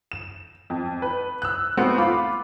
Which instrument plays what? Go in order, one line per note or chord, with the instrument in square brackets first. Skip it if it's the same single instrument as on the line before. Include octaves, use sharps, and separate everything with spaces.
[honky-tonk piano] E7
F2
B4
E6 F#6
A3 B3 C4 F#4 C5
F4 F5 B5 D6